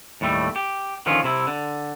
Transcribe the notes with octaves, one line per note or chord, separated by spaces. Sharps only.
D#2 A2 G3 A3
G4
D3 D#3 F3 C#4 F4
C3 E4
D3